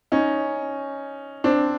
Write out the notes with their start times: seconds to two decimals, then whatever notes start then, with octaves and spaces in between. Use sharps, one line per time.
0.12 C#4 D#4
1.44 C4 D4